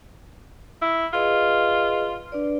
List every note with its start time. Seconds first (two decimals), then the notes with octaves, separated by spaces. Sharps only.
0.82 E4
1.13 F4 G#4 B4 D#5
2.32 D4 B4 D5